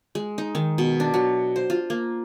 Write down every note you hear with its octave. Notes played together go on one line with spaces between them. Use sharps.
G#3
D#4
D#3
B2
D4
F#3
C5
F4
A#3